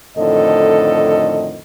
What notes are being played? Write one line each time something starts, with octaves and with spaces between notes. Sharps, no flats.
F2 A2 D3 D#3 A4 D#5